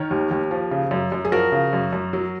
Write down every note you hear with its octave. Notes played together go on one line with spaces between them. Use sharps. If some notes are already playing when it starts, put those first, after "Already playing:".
Already playing: D#3 A#4 C#5
D#2
D#2
F3
C#3
F#2
F#2
G#4
F3 F#4 A#4
C#3
F#2
F#2
F#3